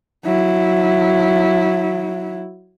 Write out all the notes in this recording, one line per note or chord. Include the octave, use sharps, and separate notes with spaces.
F#3 E4